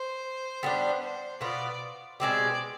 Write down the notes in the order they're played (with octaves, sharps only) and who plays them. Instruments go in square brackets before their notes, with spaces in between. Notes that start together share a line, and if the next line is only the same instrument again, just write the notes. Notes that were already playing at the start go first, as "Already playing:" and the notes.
Already playing: [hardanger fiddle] C5
[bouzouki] G3 B3 D4
[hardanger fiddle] C5
[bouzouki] B2 B3 F4 [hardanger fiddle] D5
[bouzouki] B2 G#3 C4 G4 [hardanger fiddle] D5